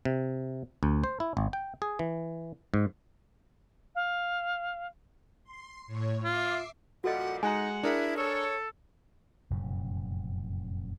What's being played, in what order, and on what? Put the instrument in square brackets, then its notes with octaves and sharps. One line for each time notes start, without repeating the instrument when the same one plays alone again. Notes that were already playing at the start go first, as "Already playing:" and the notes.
[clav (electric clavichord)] C3
D2
C5
E4
G#1
G5
G#4
E3
G#2
[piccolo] F5
[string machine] C6
A2 C#5
[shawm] F4 [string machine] E5 D6 C7
[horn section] A#2 F3 G3 [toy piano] F#4 A4 D#5 [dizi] F#5
[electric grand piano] G#3 [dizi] D#4 [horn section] F#5 [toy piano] G#5 A#5
[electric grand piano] D4 G#4 A#4 [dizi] E4
[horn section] A4 [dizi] C#5
[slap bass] F1 F#2 A#2 C#3